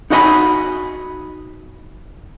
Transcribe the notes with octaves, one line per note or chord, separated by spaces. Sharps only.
D#4 E4 F#4 D#5 G#5 B5